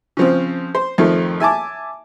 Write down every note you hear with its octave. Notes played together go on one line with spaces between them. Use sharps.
C#3 F3 C4
C5
F2 D#3 F3 A3
E5 G#5 A5 D6